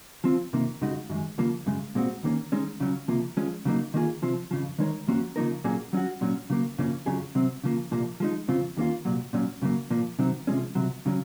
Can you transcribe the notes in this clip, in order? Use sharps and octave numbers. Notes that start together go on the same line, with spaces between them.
F3 C4 F4
F2 C3 D#3 A#3
F2 C#3 G#3 D#4 F#4
F#2 D#3 G#3
D#2 C#3 F3 A#3
F#2 C#3 G#3
A#2 G#3 C4 F#4
D#2 D#3 A#3 C#4
D#3 G#3 C#4
C#2 C#3 F#3 C#4
C#2 C3 F3 A#3
F3 G#3 C#4
C#3 F#3 A#3 D#4
D#3 A#3 F4 G#4
C3 F3 C4
F2 C#3 F3
D#3 G#3 D#4 A#4 C#5
F#2 F3 A#3 C#4 F#4
C#3 F3 A#3 D#4 A#4
A#2 F#3 A#3 C#4 G#4
F#3 C#4 F#4
A#2 F#3 C#4
C#3 F#3 A#3
F#2 C#3 F3 A#3 C#4
F2 C#3 F#3 C#4 G#4
C3 F#3 C4
C#3 F3 A#3
C2 A#2 F3 A#3
F3 G#3 D#4
F2 C#3 F3 C4 F4
D#2 D#3 A#3 C#4 F4
C2 A#2 F#3
A#2 F#3 C#4
F#2 C#3 F#3 A#3
A#2 F3 A#3
C3 D#3 F#3 C4
C3 F3 G#3 C#4
C#2 C3 F#3
C#3 F#3 C#4